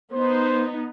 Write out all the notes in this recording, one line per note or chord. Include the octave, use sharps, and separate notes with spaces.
B3 D#4 C5